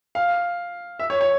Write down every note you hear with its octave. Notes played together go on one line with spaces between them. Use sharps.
F5
E5
C#5
C#5